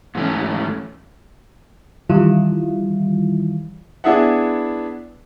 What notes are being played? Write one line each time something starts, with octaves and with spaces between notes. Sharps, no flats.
G#2 E3 A3 C#4
D#3 E3 G3 E4 F4
B3 D4 E4 G#4 E5 F#5